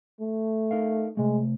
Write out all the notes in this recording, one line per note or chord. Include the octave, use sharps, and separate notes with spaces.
A3
D#4 A#4 F5
C3 G#3 A3